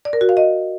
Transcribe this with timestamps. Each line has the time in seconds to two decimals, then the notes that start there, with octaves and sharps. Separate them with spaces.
0.05 D5
0.13 A#4
0.21 F#4
0.29 F5
0.37 D#5